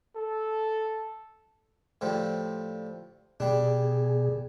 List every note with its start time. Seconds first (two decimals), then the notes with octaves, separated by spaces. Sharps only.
0.15 A4
2.01 A2 F3 G3
3.40 B2 G3 D4 G#4